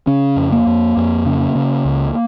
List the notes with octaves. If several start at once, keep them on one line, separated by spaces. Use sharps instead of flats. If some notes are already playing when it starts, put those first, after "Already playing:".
C#3 C#4
F2
A#3
F2
F2
C#3
C#3
C#2